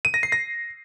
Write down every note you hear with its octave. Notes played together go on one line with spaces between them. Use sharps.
D#7
A#6
C7
A#6